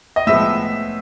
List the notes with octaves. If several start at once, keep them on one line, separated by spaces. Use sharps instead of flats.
D#5
A2 F3 G#3 B3 E5